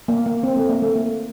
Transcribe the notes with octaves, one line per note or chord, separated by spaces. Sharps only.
A#3
A#3
C4
A3
A#3
A3
A#3